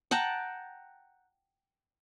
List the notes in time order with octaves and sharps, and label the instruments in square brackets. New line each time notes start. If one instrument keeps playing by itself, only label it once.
[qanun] F#5 G5 A5 A#5